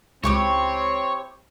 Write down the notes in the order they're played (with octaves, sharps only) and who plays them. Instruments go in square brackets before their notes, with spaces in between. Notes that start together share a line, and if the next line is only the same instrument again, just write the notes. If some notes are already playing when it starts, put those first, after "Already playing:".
[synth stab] C#2 C#6 [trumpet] C4 [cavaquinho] E4 G4 D6 [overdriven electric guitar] C#5